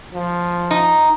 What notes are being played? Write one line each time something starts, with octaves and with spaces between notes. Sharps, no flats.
F3
D#4